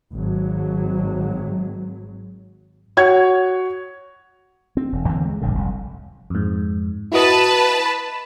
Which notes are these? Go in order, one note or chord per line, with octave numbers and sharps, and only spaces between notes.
G#1 F#3
F#4 C#5 G#6
C4
E1
D#2 D3 E3 C4
G#3
F1 A#1 G2 D3
F1 C2 F2
F2 G#2
E4 F#4 B4 D#5 A5
B5